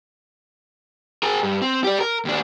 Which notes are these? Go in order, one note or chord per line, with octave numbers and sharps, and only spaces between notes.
G#4 A#4
G2
C4
G4 D5
A#4
D#2 D4